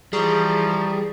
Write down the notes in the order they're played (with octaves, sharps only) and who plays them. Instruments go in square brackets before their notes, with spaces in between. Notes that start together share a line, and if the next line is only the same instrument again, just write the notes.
[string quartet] E3 F3 [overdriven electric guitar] G3 [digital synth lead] G#4 [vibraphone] A#5 C#6 D#6